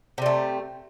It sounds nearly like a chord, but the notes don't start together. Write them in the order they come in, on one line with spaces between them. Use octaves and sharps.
C3 G3 A3